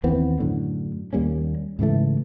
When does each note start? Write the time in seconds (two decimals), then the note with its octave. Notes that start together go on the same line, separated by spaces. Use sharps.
0.04 D#2 E3 B3 C4
0.39 F#2 A2 D3
1.13 D#2 G3 A#3 C#4
1.79 G#2 C#3 E3 A3